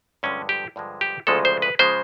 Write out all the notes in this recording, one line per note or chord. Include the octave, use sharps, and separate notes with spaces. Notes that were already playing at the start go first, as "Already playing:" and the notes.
G2 D3 F3 G#3 C#4
G4
G2 D3 F3 G#3
G4
D2 C#3 F3 G#3 A4
C5
B4
C#3 F3 G#3 C5